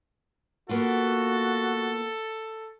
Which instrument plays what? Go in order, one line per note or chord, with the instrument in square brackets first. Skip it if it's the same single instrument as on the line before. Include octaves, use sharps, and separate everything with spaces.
[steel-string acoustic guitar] A#3 B3 F4 [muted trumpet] F#4 [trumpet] A4